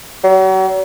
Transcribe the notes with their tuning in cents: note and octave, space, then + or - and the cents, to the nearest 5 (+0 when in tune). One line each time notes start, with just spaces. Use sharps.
F#3 +40